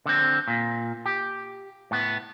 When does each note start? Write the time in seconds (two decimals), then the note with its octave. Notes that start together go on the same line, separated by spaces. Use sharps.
0.06 D3 C4
0.48 A#2
1.06 G4
1.91 A2 B3